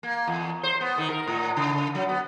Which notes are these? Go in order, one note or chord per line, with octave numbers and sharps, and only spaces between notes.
A#3
E2
C5
B3
D#3
A#4
A2
C#3
F#3
B3